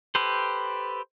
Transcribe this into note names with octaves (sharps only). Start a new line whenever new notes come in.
G4 A4 B4 C5